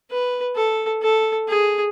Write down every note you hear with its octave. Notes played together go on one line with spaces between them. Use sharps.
B4
A4
A4
G#4